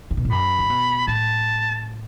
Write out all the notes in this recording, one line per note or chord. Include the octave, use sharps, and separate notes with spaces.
C#3
B2
A2
F#2 B5
C#3
B2
A2 A5